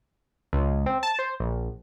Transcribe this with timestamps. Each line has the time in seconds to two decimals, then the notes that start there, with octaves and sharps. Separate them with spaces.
0.53 C#2
0.86 C4
1.03 A5
1.19 C5
1.40 A#1